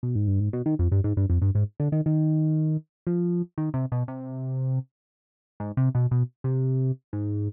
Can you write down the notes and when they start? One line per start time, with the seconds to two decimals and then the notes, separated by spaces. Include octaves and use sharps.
0.03 B2
0.15 G#2
0.27 G2
0.40 G#2
0.53 B2
0.66 D#3
0.79 F2
0.92 G2
1.04 G#2
1.17 G2
1.30 F2
1.42 G2
1.55 G#2
1.80 D3
1.92 D#3
2.06 D#3
3.07 F3
3.58 D#3
3.74 C3
3.92 B2
4.08 C3
5.60 G#2
5.77 C3
5.95 B2
6.11 B2
6.44 C3
7.13 G#2